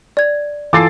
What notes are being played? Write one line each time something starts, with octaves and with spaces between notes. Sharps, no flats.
D5 G#6
E3 F4 A4 G#5 D6 A6 C7